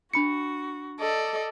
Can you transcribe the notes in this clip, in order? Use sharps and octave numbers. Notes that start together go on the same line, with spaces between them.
D4 F#4 B5 C#7
A4 D5 D#5